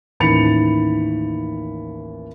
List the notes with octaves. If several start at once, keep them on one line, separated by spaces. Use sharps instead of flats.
A1 D#2 B5 A6 C#7 F7